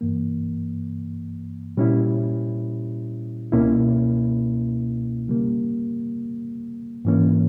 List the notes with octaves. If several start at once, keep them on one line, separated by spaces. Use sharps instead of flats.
G2 E3 A#3
A#2 G3 C#4 E4
C#2 B2 A#3 C#4 E4
C#3 G3 A#3
G#2 E3 A#3 C#4